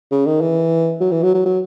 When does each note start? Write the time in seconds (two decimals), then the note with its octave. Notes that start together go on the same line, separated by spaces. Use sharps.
0.12 C#3
0.26 D#3
0.41 E3
1.01 F#3
1.12 E3
1.23 F#3
1.34 F#3
1.45 F#3